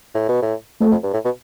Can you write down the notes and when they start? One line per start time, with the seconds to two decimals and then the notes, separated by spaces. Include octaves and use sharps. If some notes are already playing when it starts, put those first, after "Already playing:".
0.15 A2
0.29 B2
0.42 A2
0.81 F2 A3
0.91 F2
1.03 G2
1.13 A2
1.25 B2